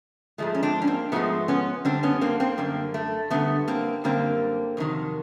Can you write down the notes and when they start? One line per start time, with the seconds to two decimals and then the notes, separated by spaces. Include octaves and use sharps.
0.38 G#2 F3 G#3 A3
0.55 C#4
0.63 C4 D4
0.82 C#4
0.87 A#3 C4
1.12 G#2 F3 G#3 A3 B3
1.48 B3 C#4
1.85 F#2 D3 G3 C4 D4
2.03 B3 C#4
2.21 A#3 C4
2.40 A#3 C4
2.58 F#2 D3 G3 A#3
2.94 A3
3.31 F#2 D3 G3 A3 B3
3.68 A#3 C4
4.04 F#2 D3 G3 A#3 C4
4.77 F2 C3 D#3 F#3